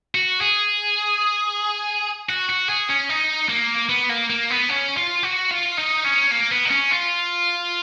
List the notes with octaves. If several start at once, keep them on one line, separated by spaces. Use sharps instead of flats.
F#4
G#4
F#4
F#4
G#4
C#4
D#4
A#3
B3
A#3
A#3
B3
C#4
F4
F#4
F4
D#4
C#4
A#3
B3
D#4
C#4
F4